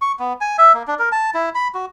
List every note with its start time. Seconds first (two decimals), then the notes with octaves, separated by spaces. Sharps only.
0.02 C#6
0.19 B3
0.41 G#5
0.58 E5
0.74 A#3
0.88 D4
0.99 A#4
1.12 A5
1.34 E4
1.55 B5
1.75 F#4